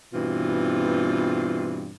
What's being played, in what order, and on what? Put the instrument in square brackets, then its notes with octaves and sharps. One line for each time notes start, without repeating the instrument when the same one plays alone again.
[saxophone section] G2 B2 E3 C4 F4